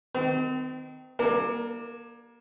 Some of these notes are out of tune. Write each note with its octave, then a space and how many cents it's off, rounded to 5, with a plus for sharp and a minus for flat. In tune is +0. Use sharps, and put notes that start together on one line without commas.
D#3 +0 C4 -40
A#3 +25 D4 +0 A#4 -40